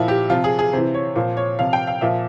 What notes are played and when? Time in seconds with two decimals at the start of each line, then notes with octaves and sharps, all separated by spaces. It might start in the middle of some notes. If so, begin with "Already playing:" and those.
Already playing: A#2 F3 E4
0.08 G4
0.30 C3 F3 F4
0.44 G#4
0.59 G#4
0.73 C3 E3 C5
0.94 C#5
1.16 A#2 F3 C5
1.37 C#5
1.59 C3 F3 F5
1.73 G5
1.87 F5
2.01 A#2 F3 E5